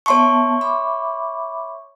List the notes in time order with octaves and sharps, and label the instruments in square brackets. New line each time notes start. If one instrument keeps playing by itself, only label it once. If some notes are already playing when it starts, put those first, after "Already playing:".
[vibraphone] B3 E5 A5 [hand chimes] C#5 C6 C#6
[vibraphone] E5 B5 D6